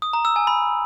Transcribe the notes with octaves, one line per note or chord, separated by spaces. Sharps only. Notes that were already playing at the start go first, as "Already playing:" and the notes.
D#6
A#5
E6
G#5
B5